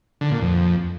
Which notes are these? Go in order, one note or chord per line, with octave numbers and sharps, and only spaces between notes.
D3
A#2
F2